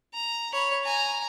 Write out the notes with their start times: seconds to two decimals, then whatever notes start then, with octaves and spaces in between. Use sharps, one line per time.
0.14 A#5
0.53 C#5 B5
0.83 G#5 A#5